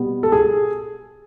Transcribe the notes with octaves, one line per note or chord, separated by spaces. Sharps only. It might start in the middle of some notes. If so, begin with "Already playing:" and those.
Already playing: B2 G3 B3
A4
G#4